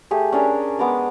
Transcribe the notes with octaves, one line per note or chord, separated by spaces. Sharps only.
A3 G4 G#4
C#4 D4 G#4 A#4
G#3 B3 A#5 D6